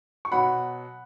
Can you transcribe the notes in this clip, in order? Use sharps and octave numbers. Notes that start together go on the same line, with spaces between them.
C#6
B2 F#3 F#5 B5